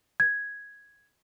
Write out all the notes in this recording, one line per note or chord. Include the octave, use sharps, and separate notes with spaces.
G#6